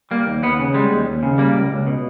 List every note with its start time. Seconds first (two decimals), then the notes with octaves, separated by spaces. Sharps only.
0.11 G3 A#3
0.27 D#2
0.43 D#2 B3
0.59 C#3
0.74 G3 G#3
0.90 D#2
1.06 D#2
1.23 C#3
1.38 G3 A#3
1.54 C#2
1.70 C#2
1.86 B2